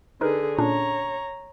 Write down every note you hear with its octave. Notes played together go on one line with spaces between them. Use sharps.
D3 D#4 G#4 A#4 B4
A#2 C#4 D4 C#5 A#5